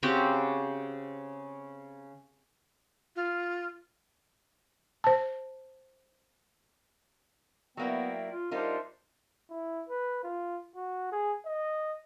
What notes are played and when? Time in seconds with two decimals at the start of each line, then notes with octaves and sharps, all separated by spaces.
0.03 C#3 C4 F#4 G4
3.16 F4
5.04 C5 A5
7.77 F#3 A#3 B3 E4 D5 E5 G5
8.30 F4
8.51 G3 D4 D#4 F4 A#4 C5 E5
9.50 E4
9.89 B4
10.24 F4
10.76 F#4
11.12 G#4
11.46 D#5